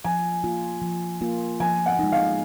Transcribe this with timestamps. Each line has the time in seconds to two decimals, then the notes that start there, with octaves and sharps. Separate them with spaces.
0.04 F3 G#5
0.44 A#3 F4
0.82 F3
1.21 A#3 F4
1.60 F3 G#5
1.86 F#5
1.99 G#3 D#4
2.12 F5